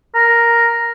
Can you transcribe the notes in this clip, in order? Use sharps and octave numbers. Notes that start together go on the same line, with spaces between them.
A#4